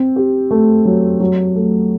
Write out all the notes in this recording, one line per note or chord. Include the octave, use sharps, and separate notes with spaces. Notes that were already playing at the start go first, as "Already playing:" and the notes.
Already playing: C4
G4
A3
F#3
F#3
A3